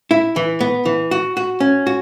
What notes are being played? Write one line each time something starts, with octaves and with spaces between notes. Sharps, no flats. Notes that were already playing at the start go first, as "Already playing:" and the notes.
E4
E3
B3
E3
F#4
F#4
C#4
F#4